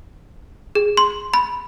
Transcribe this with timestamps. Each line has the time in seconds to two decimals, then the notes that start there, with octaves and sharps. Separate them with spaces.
0.75 G#4
0.97 C6
1.34 B5